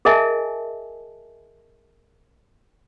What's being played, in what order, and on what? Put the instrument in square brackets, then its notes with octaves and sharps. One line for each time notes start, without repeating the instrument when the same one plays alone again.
[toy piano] G#4 A#4 D#5 E5 G#5 A5